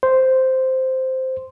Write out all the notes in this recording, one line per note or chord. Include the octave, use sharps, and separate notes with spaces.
C5